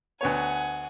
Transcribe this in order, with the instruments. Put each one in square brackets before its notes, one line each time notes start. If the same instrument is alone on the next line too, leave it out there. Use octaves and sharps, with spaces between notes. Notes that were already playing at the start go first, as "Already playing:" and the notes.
[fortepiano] D2 B3 C#5 [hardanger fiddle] F#5 G#5